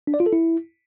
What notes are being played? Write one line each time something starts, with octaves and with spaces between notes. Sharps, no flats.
D4
D5
F4
A4
E4